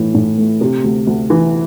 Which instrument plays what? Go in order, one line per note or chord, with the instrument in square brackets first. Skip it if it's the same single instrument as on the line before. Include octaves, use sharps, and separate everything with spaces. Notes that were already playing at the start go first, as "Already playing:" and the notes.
Already playing: [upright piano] A2 E3
A2
A3
C3
D2
D2
E3